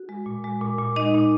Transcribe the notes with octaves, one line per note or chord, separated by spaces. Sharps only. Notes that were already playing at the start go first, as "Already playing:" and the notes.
Already playing: F#4
G#3
A#2
G#3
A#2
A#2
G#3 D#4 D#5
A#2